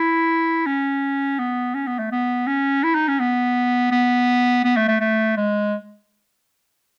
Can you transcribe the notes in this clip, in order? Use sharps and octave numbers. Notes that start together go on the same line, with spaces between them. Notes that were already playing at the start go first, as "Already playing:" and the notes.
Already playing: E4
C#4
B3
C#4
B3
A3
B3
C#4
E4
D#4
C#4
B3
B3
B3
A3
A3
A3
G#3